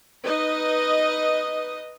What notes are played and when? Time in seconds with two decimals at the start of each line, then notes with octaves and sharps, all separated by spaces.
0.23 D#4 B4 D#5